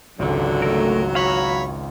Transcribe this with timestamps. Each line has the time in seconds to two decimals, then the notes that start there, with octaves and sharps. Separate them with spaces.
0.19 G#1 C#2 D3 F#3
0.62 A3 A#4
1.15 F#4 C#5 F5 A#5 B5